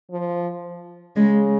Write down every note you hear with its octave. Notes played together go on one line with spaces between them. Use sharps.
F3
C#3 G#3